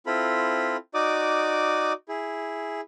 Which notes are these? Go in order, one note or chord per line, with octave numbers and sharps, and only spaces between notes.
C4 E4 F4 A4 B5
D#4 F#4 D5 D6 D#6
E4 G#4